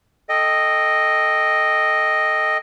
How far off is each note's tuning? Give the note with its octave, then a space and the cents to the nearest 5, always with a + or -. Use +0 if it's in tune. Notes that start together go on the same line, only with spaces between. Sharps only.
A4 +0 D#5 +0 G5 +0